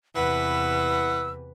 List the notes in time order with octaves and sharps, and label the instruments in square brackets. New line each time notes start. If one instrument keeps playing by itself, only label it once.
[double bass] E2 C3 [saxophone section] E3 F#5 [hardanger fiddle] B4 [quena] E6